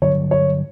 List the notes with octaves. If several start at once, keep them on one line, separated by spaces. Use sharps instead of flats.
G2 D3 F#3 C#5
C#5